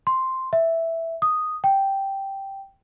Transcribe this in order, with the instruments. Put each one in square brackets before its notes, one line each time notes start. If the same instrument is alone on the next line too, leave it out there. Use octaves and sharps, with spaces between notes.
[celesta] C6
E5
D#6
G5